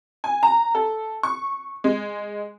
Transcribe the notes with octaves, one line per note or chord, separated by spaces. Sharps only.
G#5
A#5
A4
C#6
G#3